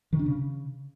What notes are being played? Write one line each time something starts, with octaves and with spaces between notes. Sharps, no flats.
D#3
D4
C#3